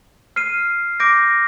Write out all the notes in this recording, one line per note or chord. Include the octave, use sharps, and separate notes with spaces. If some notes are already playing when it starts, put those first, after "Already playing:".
F6 C7 D#7
D6 G6 A#6 D7